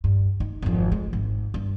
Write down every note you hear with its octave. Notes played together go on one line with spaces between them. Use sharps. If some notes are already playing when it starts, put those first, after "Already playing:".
G2
D#4
G#1 F2
G#3
G#1
G2